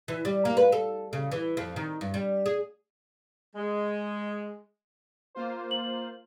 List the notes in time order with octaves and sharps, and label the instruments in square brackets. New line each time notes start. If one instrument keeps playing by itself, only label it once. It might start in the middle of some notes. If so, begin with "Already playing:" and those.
[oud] E3
G3
A#3
B4
A4
C#3
E3
F2
D#3
G2
G3
G#4
[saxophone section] G#3
[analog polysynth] A#3 F4 C5
[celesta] F#7